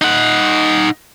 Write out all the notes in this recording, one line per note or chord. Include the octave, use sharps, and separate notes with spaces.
D#4 F#5